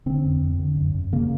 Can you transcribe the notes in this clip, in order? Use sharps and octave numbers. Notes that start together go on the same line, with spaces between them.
D3 C4
F2
F2
D3
F#2
F#2
C#3 A#3